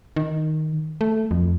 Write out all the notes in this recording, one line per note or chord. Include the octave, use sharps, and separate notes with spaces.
D#3
A3
F2